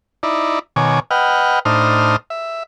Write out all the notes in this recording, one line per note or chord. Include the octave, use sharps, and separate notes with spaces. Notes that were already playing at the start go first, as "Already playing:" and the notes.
D#4 E4 D5
B2 D#3 C#5 G#5 D6
B4 D#5 F#5 G5 F6
A2 D4 D#4 C5 D#6 F6
E5